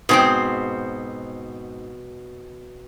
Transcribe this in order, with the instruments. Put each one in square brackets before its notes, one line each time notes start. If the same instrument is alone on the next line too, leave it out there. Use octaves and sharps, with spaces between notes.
[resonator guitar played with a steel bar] G#2 C4 G5 [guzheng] B2 G#4